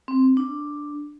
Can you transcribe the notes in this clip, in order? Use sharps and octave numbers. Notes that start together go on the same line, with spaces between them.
C4
D4